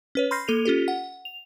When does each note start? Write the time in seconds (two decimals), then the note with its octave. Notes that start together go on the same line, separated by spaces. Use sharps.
0.15 C#4 B4 C#5
0.31 B5 C6 F6 G6 A#6 C7
0.48 A#3 A4 D#7 F7
0.65 C#4 F4 G4 A4
0.88 F#5
1.25 F7